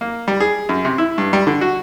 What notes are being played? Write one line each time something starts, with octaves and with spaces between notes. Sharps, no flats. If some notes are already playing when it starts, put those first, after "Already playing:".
A#3
G3
G#4
F#2
C3
E4
G2
G3
D3
F#4